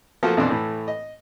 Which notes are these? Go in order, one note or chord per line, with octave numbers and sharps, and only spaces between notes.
F3 A3 A#3 F4 F#4 A4
F2 B2 E3 D4 D5 C6
A2 E3 A3
D#5